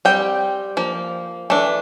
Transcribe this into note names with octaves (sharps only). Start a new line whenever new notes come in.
G3 C4 G5
F3 A#3
E3 A3 D4